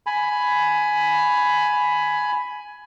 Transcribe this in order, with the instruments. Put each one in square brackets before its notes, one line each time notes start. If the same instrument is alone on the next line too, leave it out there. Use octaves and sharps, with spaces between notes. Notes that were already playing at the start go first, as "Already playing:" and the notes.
[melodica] G#5 B5